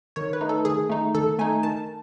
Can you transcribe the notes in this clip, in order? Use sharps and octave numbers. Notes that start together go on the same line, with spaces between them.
D#3 C#5
B4
A3 D#4
A4
D#3 G#4
A3 D#4
D#3 A4
A3 D#4 G#5
D#3 A5